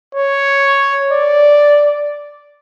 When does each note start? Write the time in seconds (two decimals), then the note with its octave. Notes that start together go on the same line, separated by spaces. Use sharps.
0.15 C#5
1.11 D5